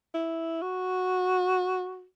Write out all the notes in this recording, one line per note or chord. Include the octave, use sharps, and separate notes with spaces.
E4
F#4